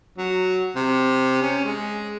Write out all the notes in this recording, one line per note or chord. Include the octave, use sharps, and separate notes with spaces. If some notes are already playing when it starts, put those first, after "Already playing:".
F#3
C3
C#4
G#3